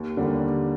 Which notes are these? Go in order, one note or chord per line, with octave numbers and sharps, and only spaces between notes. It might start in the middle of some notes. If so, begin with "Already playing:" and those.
Already playing: D#2
D3 G3 A#3